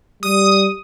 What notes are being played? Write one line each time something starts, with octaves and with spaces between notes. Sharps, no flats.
G3 D#6